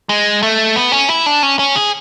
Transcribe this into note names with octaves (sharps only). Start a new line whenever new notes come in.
G#3
A3
B3
C#4
E4
D4
C#4
C#4
G#4